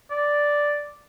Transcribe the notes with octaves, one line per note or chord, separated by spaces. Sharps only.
D5